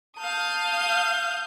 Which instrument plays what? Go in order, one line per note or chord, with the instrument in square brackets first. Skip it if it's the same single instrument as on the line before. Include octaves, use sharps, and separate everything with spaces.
[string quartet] F5 D#6 G6 [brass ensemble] A5